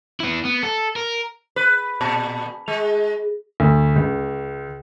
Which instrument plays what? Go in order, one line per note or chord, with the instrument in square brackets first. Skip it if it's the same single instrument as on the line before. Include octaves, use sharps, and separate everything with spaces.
[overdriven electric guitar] B3 E4
B3
A4
A#4
[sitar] B4
A#2
G#3
[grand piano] D2
C#2